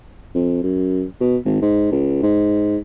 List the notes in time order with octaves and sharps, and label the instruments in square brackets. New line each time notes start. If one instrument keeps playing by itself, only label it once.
[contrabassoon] F2
F#2
B2
G#1
G#2
C#2
G#2